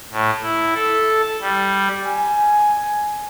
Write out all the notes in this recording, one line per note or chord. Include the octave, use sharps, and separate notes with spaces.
A2
E4
A4
G3
G#5